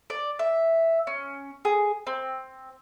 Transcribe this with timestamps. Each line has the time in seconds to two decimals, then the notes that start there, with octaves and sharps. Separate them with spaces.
0.10 D5
0.39 E5
1.07 C#4
1.65 G#4
2.07 C4